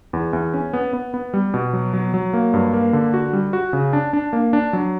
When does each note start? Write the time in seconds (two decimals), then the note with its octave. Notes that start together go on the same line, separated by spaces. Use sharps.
0.13 E2
0.33 E2
0.54 C#4
0.73 B3
0.93 B3
1.14 B3
1.34 G3
1.54 B2
1.73 F#3
1.93 F#3
2.14 F#3
2.33 A#3
2.54 G2
2.73 A#3
2.93 D3
3.14 F#4
3.33 G3
3.53 F#4
3.73 C#3
3.93 D4
4.13 D4
4.33 A#3
4.53 D4
4.73 F#3